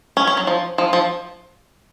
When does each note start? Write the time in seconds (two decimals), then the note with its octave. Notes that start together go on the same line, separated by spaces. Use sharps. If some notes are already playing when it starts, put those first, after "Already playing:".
0.17 C#4
0.27 C#4
0.37 F#3
0.47 F3
0.78 F3
0.93 F3